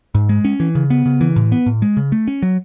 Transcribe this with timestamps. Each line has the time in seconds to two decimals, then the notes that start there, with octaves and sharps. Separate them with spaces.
0.15 G#2
0.29 G#3
0.45 C#4
0.60 E3
0.75 C#3
0.90 B3
1.06 C#3
1.21 E3
1.36 A2
1.52 B3
1.66 A2
1.82 G#3
1.97 C#3
2.12 A3
2.28 C#4
2.42 F#3